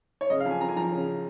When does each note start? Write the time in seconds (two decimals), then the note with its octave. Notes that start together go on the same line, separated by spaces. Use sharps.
0.21 C#5
0.30 C#3 D#5
0.40 F5
0.45 F2
0.51 G#5
0.61 F2 A#5
0.69 G#5
0.77 F3 A#5
0.92 C#3